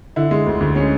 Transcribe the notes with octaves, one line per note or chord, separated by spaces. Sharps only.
D3 E4
G#3
D2
D2
G#3 C#4